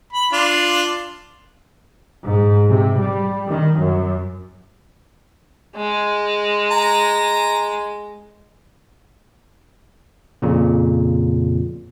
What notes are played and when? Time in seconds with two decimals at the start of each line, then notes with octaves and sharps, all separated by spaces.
0.13 B5
0.33 D4 F4
2.26 G#2
2.70 C3
2.99 G3
3.51 D#3
3.81 F#2
5.76 G#3
6.71 A#5
10.42 F2 A#2 C#3